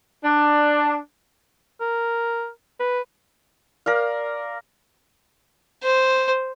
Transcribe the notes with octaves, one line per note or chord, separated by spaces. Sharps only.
D4
A#4
B4
A#4 D5 F5
C5